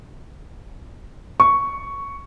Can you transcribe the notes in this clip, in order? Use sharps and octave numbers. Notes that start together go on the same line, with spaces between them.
C#6